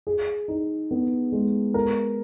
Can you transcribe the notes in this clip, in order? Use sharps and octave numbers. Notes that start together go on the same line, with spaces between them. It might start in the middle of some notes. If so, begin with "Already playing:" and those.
G#4
D#4
B3
G#3
A#4